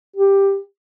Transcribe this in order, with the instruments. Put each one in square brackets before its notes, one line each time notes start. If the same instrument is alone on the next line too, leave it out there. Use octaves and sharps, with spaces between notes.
[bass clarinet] G4